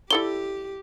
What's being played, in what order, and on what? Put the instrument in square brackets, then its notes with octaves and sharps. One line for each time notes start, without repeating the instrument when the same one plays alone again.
[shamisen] E4 A4 D5 [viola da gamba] G4 [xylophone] G7